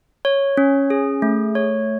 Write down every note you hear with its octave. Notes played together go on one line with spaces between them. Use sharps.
C#5
C#4
G#4
A3
C#5